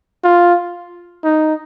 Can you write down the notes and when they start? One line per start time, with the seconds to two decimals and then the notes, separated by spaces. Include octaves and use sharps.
0.24 F4
1.24 D#4